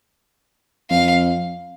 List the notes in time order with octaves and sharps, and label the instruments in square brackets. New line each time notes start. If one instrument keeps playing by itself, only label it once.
[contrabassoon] F2 [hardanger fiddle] F5